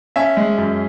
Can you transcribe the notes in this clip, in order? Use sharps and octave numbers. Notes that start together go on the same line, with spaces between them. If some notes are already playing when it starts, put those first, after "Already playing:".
C#4 E5 G#5
G#3
F#2